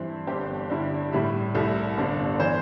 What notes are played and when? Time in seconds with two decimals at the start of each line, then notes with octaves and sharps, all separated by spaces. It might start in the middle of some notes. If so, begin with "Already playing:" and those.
Already playing: G2 E3 C4 E4
0.27 G1 G2 G3 C4 G4
0.70 G2 D3 G3 E4
1.12 A2 G3 E4
1.54 C2 C3 G3 E4 A4
1.97 G1 G2 D3 C4
2.40 E3 C5